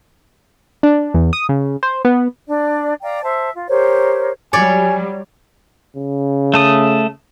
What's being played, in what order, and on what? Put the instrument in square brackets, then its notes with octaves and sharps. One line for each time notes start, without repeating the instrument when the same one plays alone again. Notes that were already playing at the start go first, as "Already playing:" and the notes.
[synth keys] D4
E2
D#6
C#3
C5
B3
[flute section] D4 D5
D5 F5 G5 A#5
C5 E5 A5
F4
G4 A#4 C5 C#5
[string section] F#3 G3 [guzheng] C#5 D5 [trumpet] G#5
[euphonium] C#3
[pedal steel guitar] A3 A5 D#6